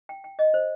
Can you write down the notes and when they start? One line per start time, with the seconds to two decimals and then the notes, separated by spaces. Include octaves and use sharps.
0.09 G5
0.24 G5
0.39 D#5
0.54 C5